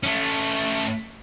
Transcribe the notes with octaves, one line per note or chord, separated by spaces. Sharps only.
A3 C#4